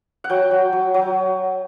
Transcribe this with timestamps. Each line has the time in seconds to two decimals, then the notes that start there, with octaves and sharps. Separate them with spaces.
0.24 F#5
0.30 F#3 G5
0.51 F#3
0.73 F#3
0.94 F#3